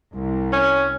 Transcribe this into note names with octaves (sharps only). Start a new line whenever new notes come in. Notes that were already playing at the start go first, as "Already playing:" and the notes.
C2
C#4